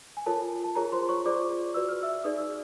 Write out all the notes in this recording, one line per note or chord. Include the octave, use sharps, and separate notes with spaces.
G#5
F4 A4 A#4 C#5 A5
A5
F4 G#4 A#4 C#5 A#5
C5 C6
C#5 C#6
F4 G#4 C5 D5 D6
F#4 B4 D5 E6
F6
E5 E6
D#4 G#4 B4 D5 D#6
E6